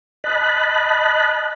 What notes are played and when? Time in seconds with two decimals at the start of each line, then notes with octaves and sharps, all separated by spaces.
0.24 D#5 A5 B5 F#6